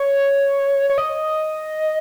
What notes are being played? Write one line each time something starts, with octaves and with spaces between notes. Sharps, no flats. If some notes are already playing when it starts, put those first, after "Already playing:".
Already playing: C#5
C#5
D#5